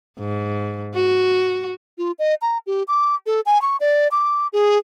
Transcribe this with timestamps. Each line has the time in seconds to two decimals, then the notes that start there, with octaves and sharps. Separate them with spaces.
0.19 G#2
0.94 F#4
1.98 F4
2.19 D#5
2.42 A#5
2.67 G4
2.88 D6
3.26 A4
3.46 G#5
3.62 C#6
3.80 D5
4.12 D6
4.53 G#4